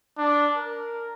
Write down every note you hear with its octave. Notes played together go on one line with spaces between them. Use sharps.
D4
A#4